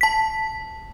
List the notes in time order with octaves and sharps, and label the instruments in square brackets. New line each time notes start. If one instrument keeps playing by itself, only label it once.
[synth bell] A5 B6